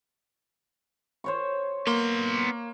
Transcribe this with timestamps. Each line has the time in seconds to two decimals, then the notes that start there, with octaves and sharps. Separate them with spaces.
1.24 C5 C#5 C#6
1.87 A#3 B3 C6